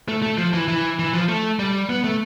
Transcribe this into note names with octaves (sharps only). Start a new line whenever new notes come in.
A3
A3
F3
E3
E3
E3
F3
A3
G3
B3
A3